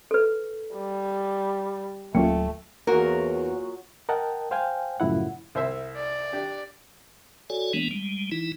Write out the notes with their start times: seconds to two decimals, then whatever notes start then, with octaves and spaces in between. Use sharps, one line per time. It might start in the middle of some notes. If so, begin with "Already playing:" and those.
0.11 A4 B4
0.74 G3
2.15 D1 F#3 A3 A#3 C#4 F4 G5
2.87 E2 F#3 A#3 F4 F#4 G#4 A#4
4.09 A#4 D#5 F#5 G5 A5
4.51 C5 F5 G5 G#5
5.00 F#2 A2 C#3 F3 E4 F#5
5.55 C2 C5 E5
5.97 D5
6.32 D4 G4
7.50 F#4 A4 C#5 D5 G#5
7.73 E3 G#3 A#3 B3 D4
7.91 G3 G#3
8.32 E3 D#4 E4